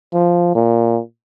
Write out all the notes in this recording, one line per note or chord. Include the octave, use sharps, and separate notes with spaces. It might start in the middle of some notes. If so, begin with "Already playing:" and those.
F3
A#2